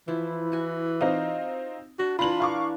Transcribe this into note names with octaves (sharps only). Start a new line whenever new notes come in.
E3 F3 E4
F#4 G#5
C4 D#4 F4 D#5
D4 F#4
E3 D4 F4 A#5 B5 F#7
F5 C#6 D6